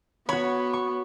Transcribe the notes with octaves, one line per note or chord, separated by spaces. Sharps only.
B3 F#4 C#5 B5
C#6